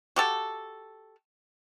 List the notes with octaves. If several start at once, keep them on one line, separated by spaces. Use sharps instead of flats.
F#4 G4 A4